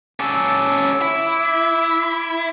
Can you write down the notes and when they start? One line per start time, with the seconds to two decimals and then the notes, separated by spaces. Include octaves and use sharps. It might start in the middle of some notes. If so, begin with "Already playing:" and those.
0.20 C#4 A4 D6 E6
1.01 E4